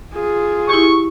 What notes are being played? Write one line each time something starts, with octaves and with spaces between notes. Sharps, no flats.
F4 G#4
E4 G4 C#6